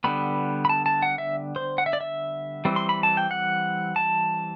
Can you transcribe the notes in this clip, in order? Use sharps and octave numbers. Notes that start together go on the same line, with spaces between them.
D3 G3 B3 B5
B5
A5
A5
F#5
E5
C5
F#5
E5
D5
E5
E3 G3 C4
C6
B5
A5
G5
F#5
A5